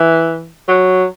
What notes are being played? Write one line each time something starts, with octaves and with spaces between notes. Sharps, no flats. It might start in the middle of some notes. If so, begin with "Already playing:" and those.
Already playing: E3
F#3